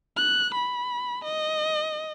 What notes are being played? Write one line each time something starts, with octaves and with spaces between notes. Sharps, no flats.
F#6
B5
D#5